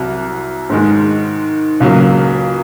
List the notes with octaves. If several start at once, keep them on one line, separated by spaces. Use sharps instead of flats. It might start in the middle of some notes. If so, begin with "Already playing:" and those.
Already playing: C2 C3 F#3
G#2 D#3 G#3
C#2 C#3 F#3 A#3